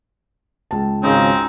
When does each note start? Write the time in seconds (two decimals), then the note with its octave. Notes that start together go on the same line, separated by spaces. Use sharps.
0.71 C#2 A5
1.03 G#1 C#3 C4 C#4 D#4 D#5